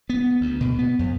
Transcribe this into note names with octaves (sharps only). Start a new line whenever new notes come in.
B3
D2
B2
B3
F2